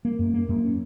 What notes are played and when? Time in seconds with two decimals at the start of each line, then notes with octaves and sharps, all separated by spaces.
0.05 A#3
0.19 F#2
0.34 A#3
0.49 F#2
0.64 C#4